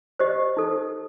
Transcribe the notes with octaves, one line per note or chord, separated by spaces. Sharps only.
G4 C5 D#5
D#4 A4